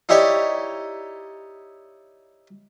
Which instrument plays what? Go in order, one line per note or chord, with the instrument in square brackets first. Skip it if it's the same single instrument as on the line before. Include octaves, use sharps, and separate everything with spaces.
[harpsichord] D#4 E4 G4 C#5 D5